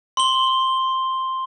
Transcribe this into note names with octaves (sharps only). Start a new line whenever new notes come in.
C6 G7